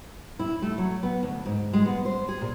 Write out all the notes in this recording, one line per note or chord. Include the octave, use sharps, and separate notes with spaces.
E4
A3
F#3
B3
D2
G#2
G#3
B3
C5
G#4
A#2